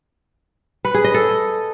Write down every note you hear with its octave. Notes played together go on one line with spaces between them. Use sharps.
B4
G#4
D#5
A4